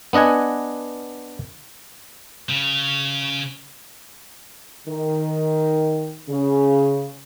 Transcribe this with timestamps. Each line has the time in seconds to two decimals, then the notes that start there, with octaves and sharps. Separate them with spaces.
0.13 B3 D4 D#5 F#5 G#5
2.50 C#3
4.87 D#3
6.29 C#3